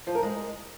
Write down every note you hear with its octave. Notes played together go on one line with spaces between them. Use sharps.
F3
A#4
G#3